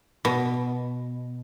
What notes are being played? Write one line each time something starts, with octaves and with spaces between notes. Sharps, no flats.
B2